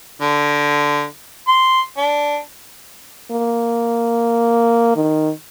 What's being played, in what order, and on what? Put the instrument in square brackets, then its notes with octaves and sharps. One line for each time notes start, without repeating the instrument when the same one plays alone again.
[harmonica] D3
C6
D4
[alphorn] A#3
D#3